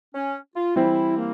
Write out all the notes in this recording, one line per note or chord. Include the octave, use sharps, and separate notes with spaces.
C#4
F4
E3 G3 C4 E4
A#3